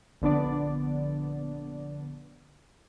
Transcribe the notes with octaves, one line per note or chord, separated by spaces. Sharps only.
A#1 D3 B3 D4 D5